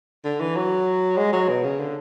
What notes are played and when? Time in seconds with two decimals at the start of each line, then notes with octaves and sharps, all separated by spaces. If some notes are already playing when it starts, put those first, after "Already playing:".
0.25 D3
0.41 E3
0.56 F#3
1.17 G#3
1.33 F#3
1.49 B2
1.64 C#3
1.80 D3